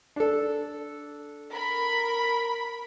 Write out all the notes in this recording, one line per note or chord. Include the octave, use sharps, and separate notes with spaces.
D4 A4
A#4 B5